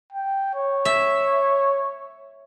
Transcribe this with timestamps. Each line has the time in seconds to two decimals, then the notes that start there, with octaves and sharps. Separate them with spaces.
0.12 G5
0.55 C#5
0.85 E5